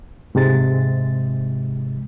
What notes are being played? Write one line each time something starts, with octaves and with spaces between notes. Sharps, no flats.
G#2 C3 G#3 A6